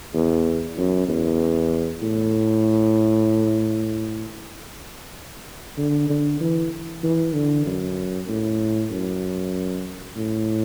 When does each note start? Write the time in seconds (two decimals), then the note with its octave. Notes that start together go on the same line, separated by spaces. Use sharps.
0.14 E2
0.77 F#2
1.08 E2
2.02 A2
5.78 D3
6.10 D3
6.40 E3
7.03 E3
7.34 D3
7.66 F#2
8.28 A2
8.91 F#2
10.16 A2